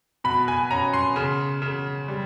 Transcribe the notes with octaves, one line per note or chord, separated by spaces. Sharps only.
B2 B5
G#5
C#4 A#5
C6
C#3
C#3
G3